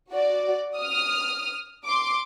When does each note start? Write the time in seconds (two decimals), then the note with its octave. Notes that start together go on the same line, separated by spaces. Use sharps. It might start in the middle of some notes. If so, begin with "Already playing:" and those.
0.12 F#4 D5
0.77 D#6 F6
1.85 C6 D6